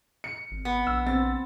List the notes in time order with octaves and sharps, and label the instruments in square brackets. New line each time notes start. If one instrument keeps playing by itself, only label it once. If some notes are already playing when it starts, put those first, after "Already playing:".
[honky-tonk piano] C#7
[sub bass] G#1
[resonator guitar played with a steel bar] B3
[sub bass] A#1 [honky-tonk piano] E6
[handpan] C4 [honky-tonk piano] A6